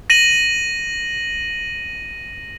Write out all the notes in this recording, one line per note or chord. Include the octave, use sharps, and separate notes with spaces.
A#6 D#7 F#7